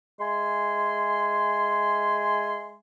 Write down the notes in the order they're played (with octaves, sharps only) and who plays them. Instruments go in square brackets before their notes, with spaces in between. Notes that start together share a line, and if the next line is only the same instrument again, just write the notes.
[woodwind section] G#3 E5 G#5 C6